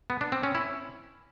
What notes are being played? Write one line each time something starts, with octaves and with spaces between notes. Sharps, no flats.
B3
D4
C4
C#4
E4